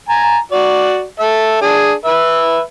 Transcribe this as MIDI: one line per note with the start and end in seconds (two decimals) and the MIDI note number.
0.09 0.38 80
0.09 0.38 82
0.52 1.03 66
0.52 1.03 74
1.20 1.61 69
1.20 1.61 76
1.61 1.93 62
1.61 1.93 68
2.05 2.60 71
2.05 2.60 76